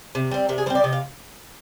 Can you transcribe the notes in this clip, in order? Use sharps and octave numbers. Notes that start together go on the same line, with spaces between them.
C3
G3 C4
C3 A#4
G#4
G3 C4 C5
D5
C3 D#5
F5